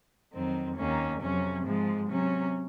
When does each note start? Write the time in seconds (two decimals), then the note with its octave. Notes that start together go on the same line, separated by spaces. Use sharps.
0.33 F2 D#3 F#3 C4
0.76 D#2 D#3 A#3 C#4
1.20 F2 C3 F#3 C#4
1.64 G#2 F3 G#3
2.08 C3 F#3 C#4